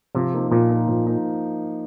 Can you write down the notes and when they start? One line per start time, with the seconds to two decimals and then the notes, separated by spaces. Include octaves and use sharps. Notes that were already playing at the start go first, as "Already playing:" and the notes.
0.15 C3 F3
0.34 A#3 D#4
0.51 A#2 F3
0.69 A#3 D#4
0.88 F3
1.06 A#3 D#4